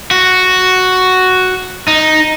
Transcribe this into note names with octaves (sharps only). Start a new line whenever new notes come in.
F#4
D#4